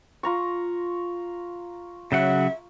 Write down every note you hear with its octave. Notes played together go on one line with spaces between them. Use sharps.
F4 A#5 C#6
C#3 F#3 E5 F#5